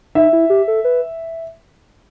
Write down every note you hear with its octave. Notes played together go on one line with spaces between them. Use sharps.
D#4 E5
E4
G4
A4
B4